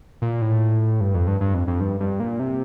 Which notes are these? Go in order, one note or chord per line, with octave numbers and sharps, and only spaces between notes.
A#2
A2
G2
F2
G2
G2
F2
F2
G2
G2
A#2
C3